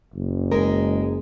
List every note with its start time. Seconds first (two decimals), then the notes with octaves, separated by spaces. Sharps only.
0.14 F#1
0.52 G#3 A#4